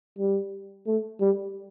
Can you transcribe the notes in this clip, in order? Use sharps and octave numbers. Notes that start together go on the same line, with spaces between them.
G3
A3
G3